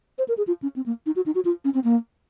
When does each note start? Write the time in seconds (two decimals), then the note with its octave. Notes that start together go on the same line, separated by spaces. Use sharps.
0.18 C5
0.28 A#4
0.37 G#4
0.47 F4
0.62 C#4
0.76 C4
0.86 A#3
1.06 D#4
1.16 F#4
1.26 D#4
1.35 F#4
1.45 F4
1.64 C#4
1.74 C4
1.84 A#3